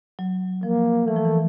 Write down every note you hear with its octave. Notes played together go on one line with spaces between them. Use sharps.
F#3
F3 A#3
E3 A3
F3
E3